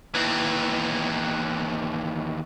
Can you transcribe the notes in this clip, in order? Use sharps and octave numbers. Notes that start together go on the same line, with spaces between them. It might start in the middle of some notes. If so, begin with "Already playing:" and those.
D#2 E3